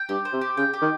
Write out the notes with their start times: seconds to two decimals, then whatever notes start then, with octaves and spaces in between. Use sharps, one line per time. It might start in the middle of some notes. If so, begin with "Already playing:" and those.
Already playing: G5
0.09 G2 G4
0.25 C5
0.33 C3
0.41 G4
0.57 C#3 G5
0.73 G4
0.81 D#3